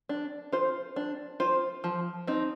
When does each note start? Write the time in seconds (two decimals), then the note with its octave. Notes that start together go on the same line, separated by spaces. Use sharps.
0.09 D4
0.52 F4 C5
0.96 D4
1.40 F4 C5
1.84 F3
2.27 C4 D#4